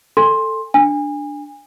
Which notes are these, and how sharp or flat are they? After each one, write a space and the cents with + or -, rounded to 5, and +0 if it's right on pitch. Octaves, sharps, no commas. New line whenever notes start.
A4 +10 G#5 -30 C6 +15
D4 +0 G#5 -30